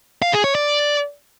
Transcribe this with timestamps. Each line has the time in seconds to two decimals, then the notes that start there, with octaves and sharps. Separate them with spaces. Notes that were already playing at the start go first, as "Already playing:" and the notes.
0.22 F5
0.33 G#4
0.44 C#5
0.55 D5